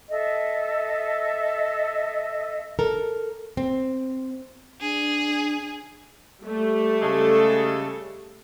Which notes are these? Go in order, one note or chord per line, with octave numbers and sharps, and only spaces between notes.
A4 D#5 E5
A4 A#4
C4
D4 G#4
G3 A3
C#3 G#3 A4